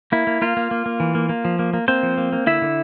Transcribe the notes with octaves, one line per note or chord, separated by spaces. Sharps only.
A#3 E4
A#3
A#3 F4
A#3
A#3
A#3
E3
A#3
A#3
F3
A#3
A#3
A#3 C4 C5
F3
A#3
A#3
D3 E4 E5
D3